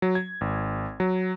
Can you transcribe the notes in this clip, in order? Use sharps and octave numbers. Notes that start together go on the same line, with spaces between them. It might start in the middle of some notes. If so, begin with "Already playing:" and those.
F#3
G#6
G#1
F#3